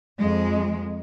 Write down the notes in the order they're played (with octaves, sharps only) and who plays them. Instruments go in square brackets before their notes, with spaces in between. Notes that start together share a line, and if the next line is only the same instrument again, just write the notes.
[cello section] F2 G#3